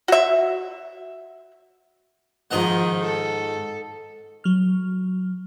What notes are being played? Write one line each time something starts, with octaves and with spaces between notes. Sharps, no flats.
F#4 E5
G#2 D#3 F3 D#5 F#5
A4
F#3 F6